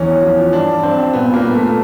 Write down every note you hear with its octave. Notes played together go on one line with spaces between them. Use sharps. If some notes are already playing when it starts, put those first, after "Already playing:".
Already playing: E2 E3 C#4
F3
G2 D4
G2 C4
A#2 B3
A#3
A#2
A3